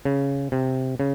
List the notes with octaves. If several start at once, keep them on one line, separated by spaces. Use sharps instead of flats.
C#3
C3
C#3